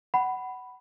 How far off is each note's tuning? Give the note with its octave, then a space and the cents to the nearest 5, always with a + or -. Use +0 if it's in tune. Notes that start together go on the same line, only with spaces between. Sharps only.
F#5 +20 B5 +0